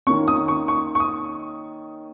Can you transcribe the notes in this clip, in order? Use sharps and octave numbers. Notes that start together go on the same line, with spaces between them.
D#3 A#3 C#4 C#6
D#6
C#6
C#6
C#6
D#6